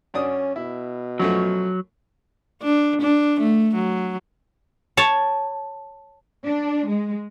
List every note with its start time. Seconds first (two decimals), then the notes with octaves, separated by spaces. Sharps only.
0.14 F#2 C#4 D4 D#6
0.56 B2 E4
1.20 F#2 F3 F#3 A3
2.63 D4
3.01 D4
3.41 A3
3.75 F#3
4.97 C#5 A5
6.46 D4
6.88 G#3